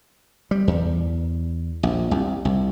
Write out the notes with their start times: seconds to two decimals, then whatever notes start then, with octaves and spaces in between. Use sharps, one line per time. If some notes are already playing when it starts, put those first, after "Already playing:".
0.51 G3
0.68 E2
1.83 A#1
2.11 C2
2.45 C2